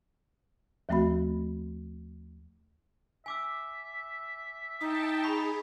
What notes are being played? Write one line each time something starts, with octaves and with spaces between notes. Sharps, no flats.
D#2 F3 A3 C4 F#4 B5
E5 G#5 D6 E6
D#4 G5 A5 D#6
G#4 B5 C#6 B6